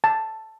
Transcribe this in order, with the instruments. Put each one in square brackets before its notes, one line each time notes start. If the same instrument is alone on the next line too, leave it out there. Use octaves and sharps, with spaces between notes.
[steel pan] A5